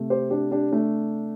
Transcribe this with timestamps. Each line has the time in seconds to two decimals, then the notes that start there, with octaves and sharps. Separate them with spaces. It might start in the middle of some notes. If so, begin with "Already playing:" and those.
Already playing: C3 A3
0.10 G4 C5
0.30 D4 G4
0.51 D4 G4
0.72 A3 D4